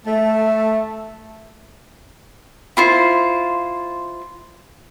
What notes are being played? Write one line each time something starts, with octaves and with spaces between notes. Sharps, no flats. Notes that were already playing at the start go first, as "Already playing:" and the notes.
A3
E4 F4 C5